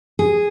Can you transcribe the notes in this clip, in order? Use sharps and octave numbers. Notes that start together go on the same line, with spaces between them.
G#4